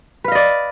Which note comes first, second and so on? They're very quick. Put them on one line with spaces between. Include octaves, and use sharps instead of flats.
B4 F5 D#5 D5